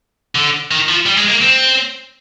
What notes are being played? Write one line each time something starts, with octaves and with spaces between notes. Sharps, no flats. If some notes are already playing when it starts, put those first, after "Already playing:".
D3
D#3
F3
G3
G#3
A#3
C4